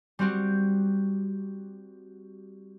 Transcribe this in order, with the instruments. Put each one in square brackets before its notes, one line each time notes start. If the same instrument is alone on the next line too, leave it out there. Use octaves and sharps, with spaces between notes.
[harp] G3 C4 F#4 G4